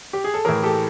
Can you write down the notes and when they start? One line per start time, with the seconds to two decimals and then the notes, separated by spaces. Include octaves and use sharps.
0.13 G4
0.24 G#4
0.34 A4
0.45 A2 E3 G#4 A#4
0.63 G4 A4